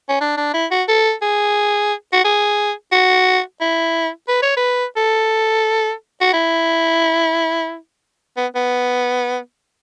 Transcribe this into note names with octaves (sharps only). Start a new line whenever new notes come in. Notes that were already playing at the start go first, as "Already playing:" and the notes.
C#4
D4
D4
E4
F#4
A4
G#4
F#4
G#4
F#4
E4
B4
C#5
B4
A4
F#4
E4
B3
B3